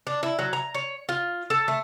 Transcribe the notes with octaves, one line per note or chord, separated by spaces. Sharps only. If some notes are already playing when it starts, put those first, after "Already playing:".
D4
E4
F#3
A#5
C#5
F4
A4
A3